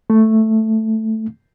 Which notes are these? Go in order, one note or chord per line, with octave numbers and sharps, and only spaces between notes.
A3